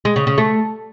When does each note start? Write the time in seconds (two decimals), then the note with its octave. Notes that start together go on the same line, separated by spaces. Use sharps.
0.05 G#3
0.16 C#3
0.27 C#3
0.38 A3